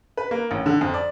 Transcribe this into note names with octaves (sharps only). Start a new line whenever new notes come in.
B4
A#3
A1
D3
F2
D5